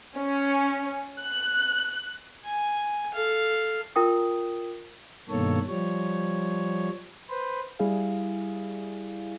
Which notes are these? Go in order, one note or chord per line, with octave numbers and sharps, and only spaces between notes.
C#4
F#6
G#5
A4 F5
F4 A#4 G5 D#6
G2 B2 D#3 A#3 A4 C#5
F3 G3 C#5
B4 C5
G3 E4 G#4 F5